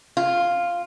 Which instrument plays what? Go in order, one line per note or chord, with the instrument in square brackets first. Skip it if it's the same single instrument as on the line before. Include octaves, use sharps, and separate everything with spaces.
[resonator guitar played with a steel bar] F4